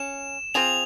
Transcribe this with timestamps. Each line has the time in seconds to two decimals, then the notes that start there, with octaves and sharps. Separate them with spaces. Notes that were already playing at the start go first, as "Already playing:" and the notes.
Already playing: C#4 E7
0.54 C4 F4 G#4 F7